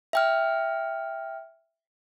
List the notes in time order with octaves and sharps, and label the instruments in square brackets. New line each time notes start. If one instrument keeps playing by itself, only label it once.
[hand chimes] E5 G5 F6